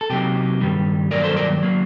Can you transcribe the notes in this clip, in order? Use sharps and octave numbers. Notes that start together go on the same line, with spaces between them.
A4
C3 F#3 A#3 D#4 G4
G2 D#3 G3
G2 D#3 F#3 A#3 A#4 D5
A4 C5
A#4 D5
F#3 A#3